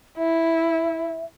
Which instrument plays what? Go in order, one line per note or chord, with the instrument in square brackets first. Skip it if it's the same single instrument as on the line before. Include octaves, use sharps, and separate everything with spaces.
[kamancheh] E4 [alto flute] E5